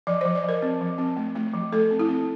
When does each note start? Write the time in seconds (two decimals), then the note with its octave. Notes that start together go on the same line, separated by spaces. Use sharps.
0.07 F3 D5
0.21 F3 C5
0.35 D5
0.44 F3 A#4
0.62 C4
0.81 F3
0.98 C4
1.17 A3
1.35 A3
1.54 F3
1.72 A3 A4
1.91 C4
1.99 E4
2.09 C4